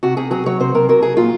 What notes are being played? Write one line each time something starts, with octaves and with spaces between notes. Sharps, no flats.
C3 F#4
C3 G#4
F#3 G#4
F#3 C#5
C3 C5
C3 A#4
F#3 A#4
F#3 G#4
A#2 F4